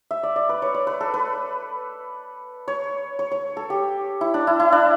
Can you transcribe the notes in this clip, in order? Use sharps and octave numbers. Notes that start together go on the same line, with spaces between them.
E5
D5
D5
B4
C#5
D5
B4
A4
B4
C#5
C#5
C#5
A4
G4
E4
D4
E4
E4
D4